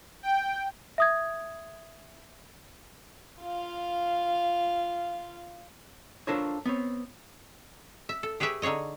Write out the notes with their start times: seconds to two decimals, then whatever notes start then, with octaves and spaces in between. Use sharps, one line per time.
0.23 G5
0.98 E5 D#6 G#6
3.42 F4 F5
6.27 D4 F4 A4 A#4 C5 C#5
6.66 B3 C4 C#5
8.09 E5
8.23 A4
8.40 G4 G#4 B4 C#5 E5 G5
8.62 D3 D#4 G#4 C#5 D#5